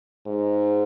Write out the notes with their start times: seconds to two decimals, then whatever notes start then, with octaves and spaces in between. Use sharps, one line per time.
0.26 G#2